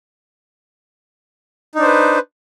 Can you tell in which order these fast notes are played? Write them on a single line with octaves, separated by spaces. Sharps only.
D#4 D4 C5 B4